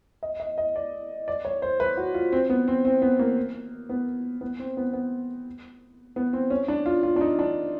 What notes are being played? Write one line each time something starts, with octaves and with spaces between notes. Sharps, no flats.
D#5
D#5
D#5
D5
D5
C#5
C5
B4
F#4
F4
C4
B3
C4
C4
B3
A#3
B3
B3
C4
B3
B3
B3
C4
C#4
D4
F4
F4
D4
D#4
D4